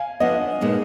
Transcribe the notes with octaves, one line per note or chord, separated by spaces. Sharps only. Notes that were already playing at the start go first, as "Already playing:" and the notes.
Already playing: F5 G#5
F3 B3 D4 D#5 F#5
A#2 G#3 B3 D#4